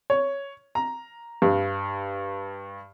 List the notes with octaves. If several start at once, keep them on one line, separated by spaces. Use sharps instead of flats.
C#5
A#5
G2